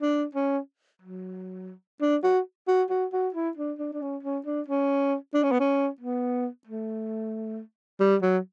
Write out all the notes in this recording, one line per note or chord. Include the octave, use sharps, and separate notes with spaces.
D4
C#4
F#3
D4
F#4
F#4
F#4
F#4
E4
D4
D4
D4
C#4
C#4
D4
C#4
D4
C#4
B3
C#4
B3
A3
G3
F#3